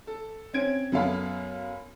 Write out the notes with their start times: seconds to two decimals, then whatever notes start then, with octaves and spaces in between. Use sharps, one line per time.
0.07 A4
0.53 C4 C#4 G#6 D7
0.92 F#2 B3 A4 F5 B5